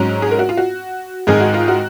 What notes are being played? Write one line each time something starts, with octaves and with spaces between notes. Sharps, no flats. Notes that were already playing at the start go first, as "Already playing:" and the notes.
Already playing: G#2 F#3 C#4
G#4
A#4
F#4
F4
F#4
G#2 D#3 G#3 D#4 G#4
F#4
F4
F#4